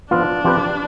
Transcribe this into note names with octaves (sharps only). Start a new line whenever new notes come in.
F3 B3 D4 F4
F3 C4 G4 B4